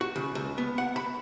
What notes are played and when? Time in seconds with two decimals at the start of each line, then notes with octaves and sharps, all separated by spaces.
0.01 F#4
0.16 C#3
0.35 C#2
0.58 B3
0.78 F#5
0.96 B5